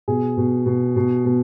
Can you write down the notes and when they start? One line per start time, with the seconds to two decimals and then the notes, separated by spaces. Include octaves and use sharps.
0.08 B2 G#4
0.37 B2
0.66 B2
0.96 B2
1.25 B2